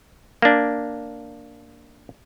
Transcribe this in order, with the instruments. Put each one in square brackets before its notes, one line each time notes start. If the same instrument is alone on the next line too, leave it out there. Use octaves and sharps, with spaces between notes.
[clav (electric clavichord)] A#3 D4